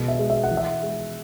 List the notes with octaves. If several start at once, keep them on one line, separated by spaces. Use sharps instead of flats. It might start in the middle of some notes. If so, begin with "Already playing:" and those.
Already playing: B2 E3 G#3
E5
G#3
E5
F#5
E3
E5
G#3